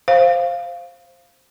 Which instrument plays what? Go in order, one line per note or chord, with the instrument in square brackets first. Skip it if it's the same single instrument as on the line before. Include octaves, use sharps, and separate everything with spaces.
[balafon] C5 F5